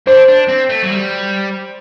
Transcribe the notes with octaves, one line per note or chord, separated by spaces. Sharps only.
D4 C5
D4
C4
A3
F#3
G3